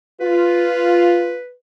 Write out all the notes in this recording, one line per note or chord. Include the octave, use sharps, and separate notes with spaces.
F4 B4